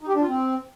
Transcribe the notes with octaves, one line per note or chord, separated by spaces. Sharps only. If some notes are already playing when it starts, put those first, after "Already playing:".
D#4
G4
D4
F4
C4